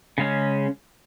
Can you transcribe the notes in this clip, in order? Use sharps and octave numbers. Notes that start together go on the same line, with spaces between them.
C#3 G#3 C#4